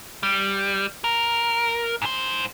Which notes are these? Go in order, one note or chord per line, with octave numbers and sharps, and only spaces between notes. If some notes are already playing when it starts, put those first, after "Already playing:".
G3
A#4
G#2 C5